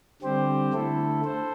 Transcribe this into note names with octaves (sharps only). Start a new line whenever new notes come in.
D3 G3 C4 G4 C5
D3 A3 E4 A4
A4 C5